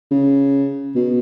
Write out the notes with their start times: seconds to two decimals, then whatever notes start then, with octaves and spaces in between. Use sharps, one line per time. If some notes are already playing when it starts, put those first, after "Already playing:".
0.11 C#3
0.95 B2